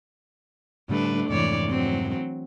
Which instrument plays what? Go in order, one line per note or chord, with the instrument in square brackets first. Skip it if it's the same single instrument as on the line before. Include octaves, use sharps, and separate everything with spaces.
[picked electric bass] A2 D3 G3 [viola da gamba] A3 D4 B4
[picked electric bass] F2 G#2 C3 [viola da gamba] E3 C#5 D5
[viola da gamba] F#3 C4